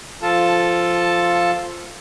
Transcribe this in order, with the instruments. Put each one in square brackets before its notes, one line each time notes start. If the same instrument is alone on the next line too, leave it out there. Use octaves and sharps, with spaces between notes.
[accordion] F3 F4 A4 A5